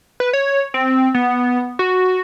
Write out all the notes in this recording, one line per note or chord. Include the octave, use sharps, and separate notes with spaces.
B4
C#5
C4
B3
F#4